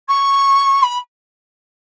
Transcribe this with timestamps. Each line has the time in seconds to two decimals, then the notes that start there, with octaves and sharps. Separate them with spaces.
0.08 C#6
0.83 B5